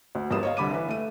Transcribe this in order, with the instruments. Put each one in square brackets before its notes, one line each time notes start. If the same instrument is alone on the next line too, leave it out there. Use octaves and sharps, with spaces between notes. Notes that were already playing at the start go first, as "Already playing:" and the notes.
[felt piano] D2
G1 G2 A#3 F4 D#6 E7
C#5 D#5 F5
C2 D3 B5 D6 D#7
E3 B4
A3 D#7